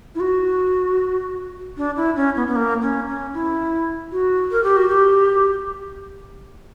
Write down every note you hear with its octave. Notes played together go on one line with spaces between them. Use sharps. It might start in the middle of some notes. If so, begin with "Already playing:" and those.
E4
F#4
D4
E4
C#4
B3
B3
A#3
C#4
C#4
E4
F#4
A#4
G4
F#4
G4